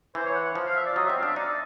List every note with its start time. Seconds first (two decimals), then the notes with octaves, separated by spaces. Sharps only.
0.15 E3 C5
0.26 C#5
0.35 F#5
0.45 F#5
0.55 F3
0.66 F5
0.76 E5
0.86 D5
0.96 F#3 D#5
1.06 C4 E5
1.16 F5
1.23 D4 E5
1.36 D#4 D5